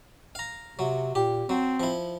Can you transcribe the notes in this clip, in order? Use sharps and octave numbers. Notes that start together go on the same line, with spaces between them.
F5 A#5
C3 F#3
A#2 G4
F#3 C4
F3 E4